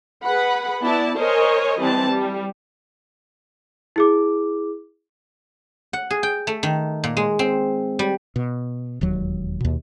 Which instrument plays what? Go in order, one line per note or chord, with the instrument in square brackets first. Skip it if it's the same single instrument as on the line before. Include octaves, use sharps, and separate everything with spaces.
[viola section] G#4 B4 F#5 B5
B3 E4 D5 A5
A#4 C5 C#5 D#5 G#5
E3 G3 C4 A5
G3
[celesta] E4 G#4 D6
[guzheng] F#5
G#4
G5
A3
D#3
A#2
G#3
C4
G3
[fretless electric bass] B2
E1 D#2 F#3
D#2 B2